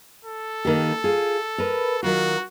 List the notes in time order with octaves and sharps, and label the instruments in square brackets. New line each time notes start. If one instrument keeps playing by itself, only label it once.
[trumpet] A4
[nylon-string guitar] D#3 A#3 G4
F4 G#4
A#4 B4
[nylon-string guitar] D#3 F#3 F4 [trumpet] F#4